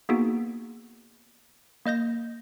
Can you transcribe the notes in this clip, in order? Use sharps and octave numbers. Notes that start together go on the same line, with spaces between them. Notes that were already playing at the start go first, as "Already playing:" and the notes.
A#3 B3 D#4 F#4 G#4
A#3 D#5 G6 A#6